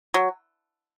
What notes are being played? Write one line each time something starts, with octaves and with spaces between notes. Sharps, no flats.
F#3